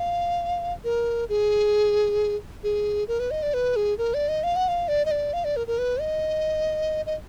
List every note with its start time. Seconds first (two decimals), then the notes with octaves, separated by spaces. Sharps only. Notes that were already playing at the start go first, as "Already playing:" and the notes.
Already playing: F5
0.84 A#4
1.29 G#4
2.63 G#4
3.08 A#4
3.20 B4
3.31 D#5
3.43 D5
3.54 B4
3.76 G#4
3.98 A#4
4.14 D5
4.29 D#5
4.44 F5
4.56 F#5
4.68 F5
4.88 D5
5.05 D#5
5.11 D5
5.33 F5
5.45 D5
5.56 A#4
5.67 A#4
5.78 B4
6.00 D#5
7.06 D#5